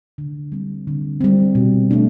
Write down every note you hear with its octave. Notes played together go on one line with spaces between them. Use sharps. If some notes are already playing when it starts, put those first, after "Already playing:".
D3
G3 C4
D3
G3 C4
B2
A3 D4